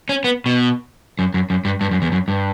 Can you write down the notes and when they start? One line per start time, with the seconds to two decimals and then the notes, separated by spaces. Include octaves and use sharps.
0.09 C#4
0.24 B3
0.46 B2
1.19 F#2
1.34 F#2
1.50 F#2
1.65 G2
1.81 G2
1.91 F#2
2.02 E2
2.12 F#2
2.28 G2